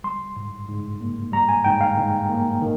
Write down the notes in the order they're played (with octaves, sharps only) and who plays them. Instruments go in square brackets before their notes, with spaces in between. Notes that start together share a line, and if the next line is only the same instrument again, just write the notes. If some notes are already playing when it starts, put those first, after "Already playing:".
[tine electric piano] G3 C6
G#2
G#2
A#3
G3 A#5
G#5
G#2 G5
F5
G#2
A#3
D#3